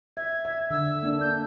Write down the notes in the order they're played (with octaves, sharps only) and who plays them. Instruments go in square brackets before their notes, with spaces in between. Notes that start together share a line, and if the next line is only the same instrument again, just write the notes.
[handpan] E5 [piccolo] G#6
[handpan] E5
[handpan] D3 [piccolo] E6
[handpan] A#3 D4
[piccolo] G6